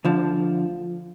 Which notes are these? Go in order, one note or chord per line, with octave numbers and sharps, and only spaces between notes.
D2 D3 F3